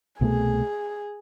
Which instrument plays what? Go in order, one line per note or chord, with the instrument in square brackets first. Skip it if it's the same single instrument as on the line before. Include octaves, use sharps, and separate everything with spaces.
[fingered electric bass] C2 B2 A3 [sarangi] G#4